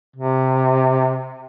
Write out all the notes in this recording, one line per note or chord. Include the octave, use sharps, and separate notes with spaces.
C3